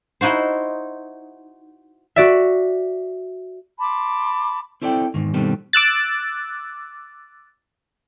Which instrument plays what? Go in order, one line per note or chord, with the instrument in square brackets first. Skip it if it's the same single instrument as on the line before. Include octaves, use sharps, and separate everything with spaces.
[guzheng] D#4 E4 F#4 C5
[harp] F#4 D5 E5
[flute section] A5 B5 C6 D6
[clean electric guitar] C4 E4 A4 D5 D#5 G5
E2 G#2 D#3
G2 B2 D#3 G3 C4 A4
[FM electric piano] D6 E6 F#6 A6